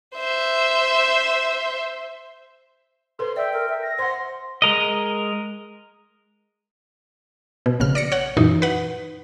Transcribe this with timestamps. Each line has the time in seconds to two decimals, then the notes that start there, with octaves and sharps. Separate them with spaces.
0.16 C5 E5
3.19 A4 B4 C5 C6
3.36 D5 E5 G5
3.53 A#4
3.69 E5
3.82 A#6
3.99 C5 F#5 C6
4.62 G#3 A#4 D#5
7.66 B2
7.80 A#1 C#3 F6
7.95 D5 A#6 C#7
8.12 C#5 F#5
8.37 F#2 A#2 E3 D#4
8.62 B4 F#5